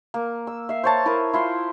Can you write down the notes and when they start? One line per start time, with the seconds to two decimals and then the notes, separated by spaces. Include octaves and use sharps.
0.14 A#3
0.47 E6
0.69 E5 F5
0.83 C5 C#5 A5
1.06 E4 A#4 D#6
1.34 E4 F4 C6